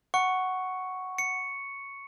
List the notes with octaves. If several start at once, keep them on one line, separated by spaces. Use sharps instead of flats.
F#5 C#6
C#7